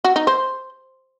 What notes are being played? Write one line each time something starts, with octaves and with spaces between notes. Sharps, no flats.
F#4
D#4
C5